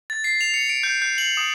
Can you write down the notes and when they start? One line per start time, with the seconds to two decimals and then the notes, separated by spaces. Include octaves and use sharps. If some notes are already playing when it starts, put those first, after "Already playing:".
0.10 A6
0.24 C7
0.41 F7
0.54 C#7
0.69 D7
0.83 G6
1.02 G6
1.18 F#7
1.37 D#6